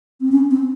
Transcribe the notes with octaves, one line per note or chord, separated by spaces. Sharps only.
C4
C#4
C4